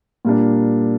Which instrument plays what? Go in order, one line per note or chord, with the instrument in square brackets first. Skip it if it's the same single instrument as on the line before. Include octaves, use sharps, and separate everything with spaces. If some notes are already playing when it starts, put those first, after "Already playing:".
[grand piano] A#2 G3 A#3 D4